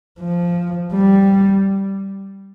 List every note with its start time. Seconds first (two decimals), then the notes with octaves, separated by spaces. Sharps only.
0.20 F3
0.93 G3